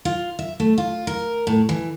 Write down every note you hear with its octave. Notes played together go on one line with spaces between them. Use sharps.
F4
E5
A3
F4
A#4
A2
E3